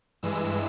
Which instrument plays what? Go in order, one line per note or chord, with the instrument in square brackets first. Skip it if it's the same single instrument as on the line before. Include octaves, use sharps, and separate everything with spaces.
[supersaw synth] G2 E3 G#3 E6